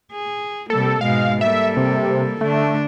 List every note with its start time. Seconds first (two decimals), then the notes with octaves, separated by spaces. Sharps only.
0.12 G#4
0.70 C3 G3 A#3 A4
1.01 G#2 B2 G#3 F5
1.41 G3 A#3 A4 E5
1.77 C3
2.41 D3 A3 D4